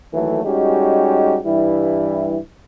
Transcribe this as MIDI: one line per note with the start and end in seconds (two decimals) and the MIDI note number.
0.14 0.43 39
0.14 0.43 52
0.14 0.43 54
0.14 0.43 57
0.45 1.38 55
0.45 1.38 56
0.45 1.38 61
0.45 1.38 63
0.45 1.38 66
0.45 1.38 67
1.45 2.37 43
1.45 2.37 52
1.45 2.37 55
1.45 2.37 64